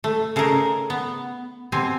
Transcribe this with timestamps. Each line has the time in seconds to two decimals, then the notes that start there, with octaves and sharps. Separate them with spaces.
0.04 A3
0.36 C#3 A3 D#4 G#4 A#4
0.90 B3
1.72 B2 C4 G4 G#5